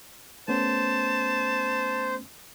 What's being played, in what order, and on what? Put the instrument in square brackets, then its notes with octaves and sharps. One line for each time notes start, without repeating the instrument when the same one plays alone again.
[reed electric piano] A3 B3 C#4 [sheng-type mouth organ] C5 [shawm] A5